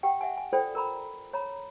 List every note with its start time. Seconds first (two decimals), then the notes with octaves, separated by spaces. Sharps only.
0.03 G4 F#5 G5
0.21 E5 F#5 G#5
0.37 G#5
0.53 F4 A4 C5 D5 G5
0.75 A#4 A#5 B5
1.33 C#5 A#5 B5